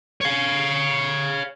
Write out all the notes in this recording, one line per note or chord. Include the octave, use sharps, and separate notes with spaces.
C#5 F5